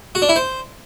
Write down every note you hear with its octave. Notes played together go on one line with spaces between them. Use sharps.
F#4
D4
E4
C5